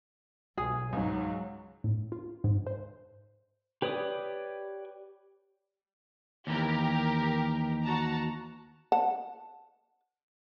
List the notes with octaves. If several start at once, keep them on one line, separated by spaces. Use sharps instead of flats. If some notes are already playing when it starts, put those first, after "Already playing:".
B1 G#4
C#2 G#2 F#3
A2
F4
G#2
C5
G4 B4 C#5 D5 D#6
D#2 E3 G4 A#4
F#4 A5 A#5
F#5 A5